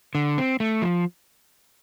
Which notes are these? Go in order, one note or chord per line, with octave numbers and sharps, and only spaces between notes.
D3
C4
A3
F3